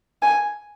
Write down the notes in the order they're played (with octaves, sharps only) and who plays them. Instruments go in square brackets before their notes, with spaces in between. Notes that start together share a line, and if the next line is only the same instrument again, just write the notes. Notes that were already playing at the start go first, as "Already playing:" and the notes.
[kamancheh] G#5